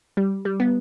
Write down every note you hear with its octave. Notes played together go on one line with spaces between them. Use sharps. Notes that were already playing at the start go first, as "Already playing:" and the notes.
G3
G3
B3